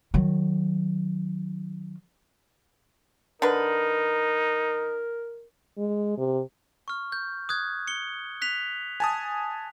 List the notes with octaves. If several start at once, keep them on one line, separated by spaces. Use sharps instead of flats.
D#3 F#3
D3 D#4 A#4 B4
G#3
C3
C#6 F6
G6
D#6 F#6 G#6
C#7 G7
F#6 B6 F7
G#5 A5 D#6